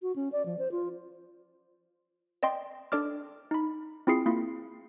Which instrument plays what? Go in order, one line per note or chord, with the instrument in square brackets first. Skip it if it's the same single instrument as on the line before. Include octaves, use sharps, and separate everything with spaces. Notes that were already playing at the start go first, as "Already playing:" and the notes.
[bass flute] F#4
C#4
D5
F3
C5
F4
[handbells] D5 D#5 G5 C6
D4 A4 D5 D6 F6
D#4 B5
C4 E4 F4 G#4 C7 C#7
A#3 E4 F4